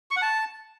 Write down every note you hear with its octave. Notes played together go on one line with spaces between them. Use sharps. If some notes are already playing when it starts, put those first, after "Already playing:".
C#6
F#5
A5